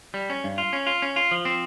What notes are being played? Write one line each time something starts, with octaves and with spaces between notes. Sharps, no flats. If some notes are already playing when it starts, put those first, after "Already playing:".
G3
C#4
G2
F4
C#4
F4
C#4
F4
F3
C4